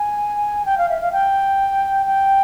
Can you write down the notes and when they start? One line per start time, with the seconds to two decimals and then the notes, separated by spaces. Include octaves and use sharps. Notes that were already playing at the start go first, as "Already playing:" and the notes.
Already playing: G#5
0.66 G5
0.78 F5
0.89 E5
1.01 F5
1.12 G5
2.06 G5